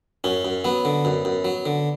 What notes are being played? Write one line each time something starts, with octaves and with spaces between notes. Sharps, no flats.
F#2 C#4
F#2
F#3 B3
D3
F#2
F#2
F#3
D3